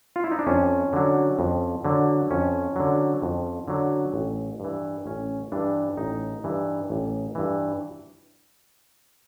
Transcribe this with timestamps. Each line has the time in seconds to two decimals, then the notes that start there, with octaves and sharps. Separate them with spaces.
0.16 F4
0.24 E4
0.31 D#4
0.39 D4
0.47 F2 C#4
0.93 D3 F#3
1.39 F2
1.85 D3 F#3
2.31 F2 C#4
2.76 D3 F#3
3.22 F2
3.68 D3 F#3
4.14 A1
4.60 G2 E3
5.06 A1 C#4
5.52 G2 E3 D4
5.97 A1 D#4
6.44 G2 E3
6.90 A1
7.35 G2 E3